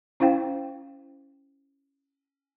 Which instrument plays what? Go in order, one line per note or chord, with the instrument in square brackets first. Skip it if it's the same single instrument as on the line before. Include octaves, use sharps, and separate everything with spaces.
[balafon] C#4 E4 C5 F5 G5